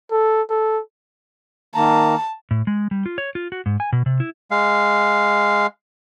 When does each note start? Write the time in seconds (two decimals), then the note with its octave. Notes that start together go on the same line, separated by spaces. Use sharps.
0.12 A4
0.50 A4
1.75 D#3 A#3 A5 A#5
2.51 A2
2.67 G#3
2.91 G3
3.06 F4
3.18 C#5
3.35 F4
3.52 F#4
3.66 G#2
3.80 G#5
3.93 B2
4.06 C3
4.20 E4
4.51 G#3 F5